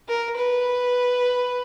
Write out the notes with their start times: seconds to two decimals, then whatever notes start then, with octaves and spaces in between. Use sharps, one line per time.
0.08 A#4
0.36 B4